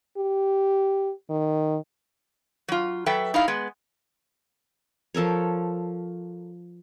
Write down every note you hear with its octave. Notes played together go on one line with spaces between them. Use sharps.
G4
D#3
F#3 F4
F#3 A4 B4 E5 G5
D#4 E4 F5
G#3 B3
F3 A4 A#4 C#5